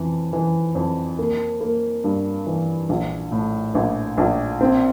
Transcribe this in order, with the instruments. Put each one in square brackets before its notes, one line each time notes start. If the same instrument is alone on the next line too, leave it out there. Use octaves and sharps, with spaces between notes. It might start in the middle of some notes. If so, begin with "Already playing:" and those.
Already playing: [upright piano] F2 E3
E3
F2
A#3
A#3
G2
E3
A#1
A2
A#1
A#1
C4